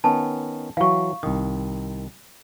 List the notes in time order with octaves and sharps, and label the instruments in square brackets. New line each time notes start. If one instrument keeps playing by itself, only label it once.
[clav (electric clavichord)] D#3 B3 C#4 [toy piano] A5
[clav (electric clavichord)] E3 F#3 [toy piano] F5 C#6
[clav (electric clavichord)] C2 D#3 [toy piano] D#6